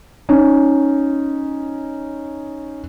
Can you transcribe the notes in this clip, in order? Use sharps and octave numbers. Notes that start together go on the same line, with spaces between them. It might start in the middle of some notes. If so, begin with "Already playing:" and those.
C#4 D#4